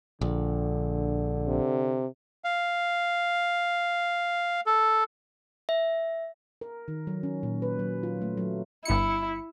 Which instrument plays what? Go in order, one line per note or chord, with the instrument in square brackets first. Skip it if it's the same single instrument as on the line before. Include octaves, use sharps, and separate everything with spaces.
[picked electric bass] A#1 [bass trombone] D3
[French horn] C3
[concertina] F5
A4
[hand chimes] E5
[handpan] A#4
D#3
F#3
C#4
A#2
B4
F#3
F4
A3
F#3
[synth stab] G1 C#7 [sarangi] E4